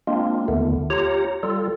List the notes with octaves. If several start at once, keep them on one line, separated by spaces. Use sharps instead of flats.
G#3 A#3 C4 D4 F4
D#2 D3 D#3 A3 B3
F4 G4 C#5 A#5
G3 F4 A4